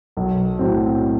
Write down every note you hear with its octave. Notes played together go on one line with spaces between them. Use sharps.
B1
A2 F#3 C4